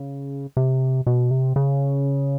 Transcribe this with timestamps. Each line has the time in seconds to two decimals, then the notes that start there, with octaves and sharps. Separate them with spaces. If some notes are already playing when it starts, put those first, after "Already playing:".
Already playing: C#3
0.57 C3
1.07 B2
1.31 C3
1.56 C#3